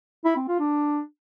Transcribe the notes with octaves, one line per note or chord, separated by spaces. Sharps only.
E4
C4
F4
D4